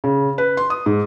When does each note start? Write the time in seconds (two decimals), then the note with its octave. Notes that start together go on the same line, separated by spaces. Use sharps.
0.04 C#3
0.38 B4
0.57 C6
0.70 D#6
0.86 G#2